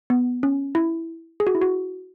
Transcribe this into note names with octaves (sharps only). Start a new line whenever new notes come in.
B3
C#4
E4
G#4
F#4
E4
F#4